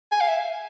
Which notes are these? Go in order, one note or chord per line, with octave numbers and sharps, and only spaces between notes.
G#5
F5
E5